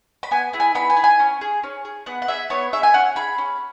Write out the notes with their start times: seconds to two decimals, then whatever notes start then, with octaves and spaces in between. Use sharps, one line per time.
0.23 B5
0.31 B3 G#5
0.53 E4 G#4
0.60 G#5
0.75 B3 B5
0.90 G#5
0.97 E4 G#4
1.04 G#5
1.19 C#4
1.41 G#4
1.63 C#4
1.85 G#4
2.06 B3 F#5
2.22 F#5
2.28 G#4 E5
2.50 B3 C#5
2.73 G#4 E5
2.83 G#5
2.94 C#4 F#5
3.16 G#4 B5
3.38 C#4